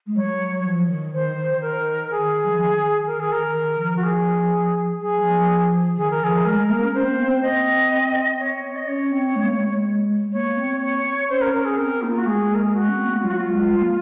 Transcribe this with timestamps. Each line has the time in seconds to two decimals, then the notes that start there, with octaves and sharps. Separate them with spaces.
0.06 G#3
0.16 F#3 C#5
0.64 F3
0.89 D#3
1.13 D#3 C5
1.37 D#3
1.61 A#4
2.10 G#4
2.44 F#3
2.51 F3
2.58 D#3
3.07 A#4
3.20 G#4
3.32 A#4
3.55 D#3
3.79 F3
3.96 F#4
4.03 G#4
5.00 F#3 G#4
5.20 F#3
5.24 F3
5.97 D#3 G#4
6.10 D#3 A#4
6.21 F3 G#4
6.45 G#3 A#4
6.57 G#3
6.69 A#3
6.81 C#4
6.94 C#4 C5
7.03 C4
7.12 A#3
7.21 C4
7.42 D#5
8.39 C#5
8.76 D#5
8.87 C#4 C#5
9.11 C4
9.36 G#3
9.44 A#3
9.52 G#3
10.32 A#3 C#5
10.57 C4
10.81 C#5
11.29 C#4 C5
11.41 A#4
11.53 C#4 A#4
11.65 G#4
11.78 C4 A#4
12.02 A#3 D#4
12.10 F4
12.18 F#4
12.26 G#3 G#4
12.55 A#4
12.65 G#4
12.74 F#4
12.88 C#4
12.97 C4
13.06 A#3
13.14 G#3
13.22 F#3 F4
13.30 F#4
13.37 F4
13.47 G#3
13.71 F#3
13.81 A#3